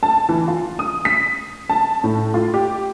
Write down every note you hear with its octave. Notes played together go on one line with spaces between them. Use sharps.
A5
E3
F4
D#6
B6
A5
A2
F4
G4